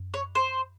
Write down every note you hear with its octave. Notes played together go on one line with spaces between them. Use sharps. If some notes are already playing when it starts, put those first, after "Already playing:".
Already playing: F#2
C#5
C5